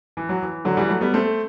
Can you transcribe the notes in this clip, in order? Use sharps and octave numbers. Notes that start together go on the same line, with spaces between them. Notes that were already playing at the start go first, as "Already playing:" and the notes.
E3
F#3
E3
D3 F#3
E3 G3
F#3 A3
G3 B3
A3 C4